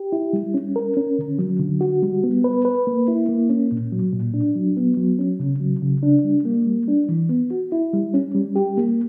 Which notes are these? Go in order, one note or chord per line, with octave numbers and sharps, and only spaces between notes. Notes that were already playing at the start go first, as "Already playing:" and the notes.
Already playing: G4
E4
G3
C#4
A#4
C#4
D3
F#3
D3
F#4
G3
B3
B4
B4
A#3
E4
A#3
C#4
A#2
F#3
A#2
D4
F#3
B3
F#3
C#4
C#3
F#3
C#3
D4
G3
A#3
G3
D4
E3
B3
F#4
E4
G3
C#4
G3
G4
A#3